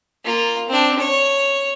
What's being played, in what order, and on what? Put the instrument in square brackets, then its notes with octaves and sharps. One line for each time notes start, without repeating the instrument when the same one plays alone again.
[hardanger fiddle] A#3 F4
C4 D4
C#5